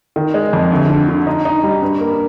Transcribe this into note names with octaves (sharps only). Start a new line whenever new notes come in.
D#3
G#3
F2
D2
D3
D3
D#4
D#4
G3
G2
A#3